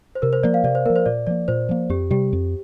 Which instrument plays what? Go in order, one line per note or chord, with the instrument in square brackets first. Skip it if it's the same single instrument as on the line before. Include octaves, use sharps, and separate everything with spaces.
[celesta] C5
[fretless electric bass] C3 [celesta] A#4
[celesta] C5
[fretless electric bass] F3 A#3 [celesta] D5
[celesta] F5
[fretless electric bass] C3 [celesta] D5
[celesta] C5
[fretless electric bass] F3 A#3 [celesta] A#4
[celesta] C5
[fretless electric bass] A#2 [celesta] D5
[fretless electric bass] F3 A#3 [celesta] D5
[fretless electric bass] A#2 [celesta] C5
[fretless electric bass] F3 A#3
[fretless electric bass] F2 [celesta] G4
[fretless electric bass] C3 G3 [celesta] G4
[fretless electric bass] F2